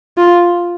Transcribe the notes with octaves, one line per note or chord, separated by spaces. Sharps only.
F4